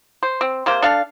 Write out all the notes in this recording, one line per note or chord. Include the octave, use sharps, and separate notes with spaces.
C5
C4
C3 A#3 C5
D4 A4 F5